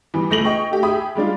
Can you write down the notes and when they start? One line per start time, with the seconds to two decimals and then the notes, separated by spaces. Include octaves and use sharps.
0.14 E3 G3 B3
0.30 C#2 A3 A#6 F7 F#7
0.45 G#4 D#5 G5 C#6
0.71 A3 G4
0.83 G4 G#4 E5 B5 D#6
1.15 G3 G#3 D4 F4